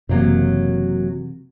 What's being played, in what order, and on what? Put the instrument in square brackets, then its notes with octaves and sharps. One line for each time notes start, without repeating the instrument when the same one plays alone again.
[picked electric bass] F#1 [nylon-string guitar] F#2 F#3 A#3 [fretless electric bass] C3 E3